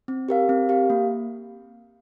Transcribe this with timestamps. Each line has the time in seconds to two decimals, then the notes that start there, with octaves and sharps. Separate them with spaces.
0.08 C4
0.29 G4 A#4 F5
0.49 C4
0.69 G4 A#4 F5
0.90 A#3